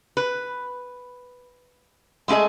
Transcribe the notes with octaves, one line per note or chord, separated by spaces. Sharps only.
B4
G#3 A3 E4 G#4 D#5